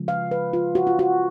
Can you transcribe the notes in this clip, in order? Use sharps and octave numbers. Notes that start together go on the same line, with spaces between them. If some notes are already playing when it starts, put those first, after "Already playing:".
Already playing: C#3 F3 G#3
F5
B4
F4
F#4
F4
F#4